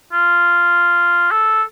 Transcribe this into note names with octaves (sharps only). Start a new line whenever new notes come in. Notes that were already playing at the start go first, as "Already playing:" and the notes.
F4
A4